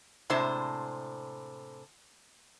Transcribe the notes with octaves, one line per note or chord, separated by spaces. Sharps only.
A2 C3 G#3 D4 C5 A5